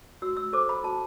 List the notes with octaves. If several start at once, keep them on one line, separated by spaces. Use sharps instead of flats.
F#4 E6
E6
A4 C5 D6
B5
F#4 A5